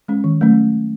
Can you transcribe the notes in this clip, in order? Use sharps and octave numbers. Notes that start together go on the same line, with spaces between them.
G#3 C#4
D#3
F#3 A3 C#4